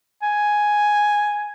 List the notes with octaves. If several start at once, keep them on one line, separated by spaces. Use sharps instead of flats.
G#5